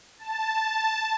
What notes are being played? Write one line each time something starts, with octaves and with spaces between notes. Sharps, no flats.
A5